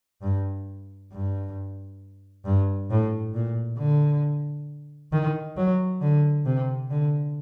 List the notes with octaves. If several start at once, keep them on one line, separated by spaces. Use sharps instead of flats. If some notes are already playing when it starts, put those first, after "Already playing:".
G2
G2
G2
A2
A#2
D3
D#3
F#3
D3
C3
D3